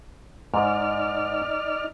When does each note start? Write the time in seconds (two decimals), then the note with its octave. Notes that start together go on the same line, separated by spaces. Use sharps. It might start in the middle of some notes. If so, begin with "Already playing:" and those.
0.54 G#2 D#4 D5 F6